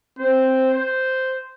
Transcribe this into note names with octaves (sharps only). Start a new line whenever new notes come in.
C4 C5
C5